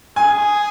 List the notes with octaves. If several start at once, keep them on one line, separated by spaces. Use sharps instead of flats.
G#4 G#5